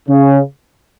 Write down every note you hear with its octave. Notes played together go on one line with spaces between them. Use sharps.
C#3